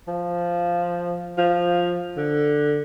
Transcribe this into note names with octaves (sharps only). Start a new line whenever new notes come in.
F3
F3
D3